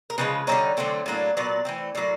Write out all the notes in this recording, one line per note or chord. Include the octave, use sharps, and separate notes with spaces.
A#4
C#3 F3 G#3 B4
D3 G3 C4 D#4 C#5
D3 F#3 A3 C4
A2 F#3 A#3 D4
A#2 F#3 B3 D5
E3 A3 C4
A2 F#3 A#3 D5